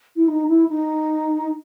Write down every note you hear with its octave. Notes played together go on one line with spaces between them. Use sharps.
E4
D#4
E4
D#4